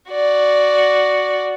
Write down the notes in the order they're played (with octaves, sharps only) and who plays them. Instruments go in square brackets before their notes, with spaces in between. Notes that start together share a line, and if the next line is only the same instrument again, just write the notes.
[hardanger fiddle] F#4 D5